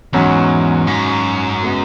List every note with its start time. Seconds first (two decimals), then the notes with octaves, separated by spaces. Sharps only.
0.13 E2 G#2 F#3 C#4 F#4
0.87 F#2
1.61 C#3 G#3 B3 F#4